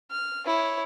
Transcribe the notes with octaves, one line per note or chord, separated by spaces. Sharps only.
F6
E4 C#5